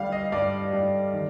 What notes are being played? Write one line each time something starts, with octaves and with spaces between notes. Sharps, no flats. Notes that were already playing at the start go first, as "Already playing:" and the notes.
Already playing: D3 G3 F5
D#5
G2 D5
G2
D#3